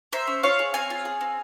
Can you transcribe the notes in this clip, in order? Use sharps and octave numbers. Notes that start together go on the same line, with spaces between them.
A#3 C5 E5
C#4
F4 C#5 F5
G#4
C4 F5 G#5
F4
G#4
C4